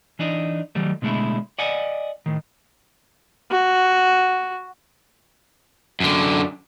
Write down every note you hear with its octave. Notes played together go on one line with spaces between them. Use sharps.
E3 D4 D#4
D#3 F#3 G3 A3
B2 D3 G#3 A3 E4
D5 D#5 F#5 G#5
A2 D#3
F#4
F#2 D3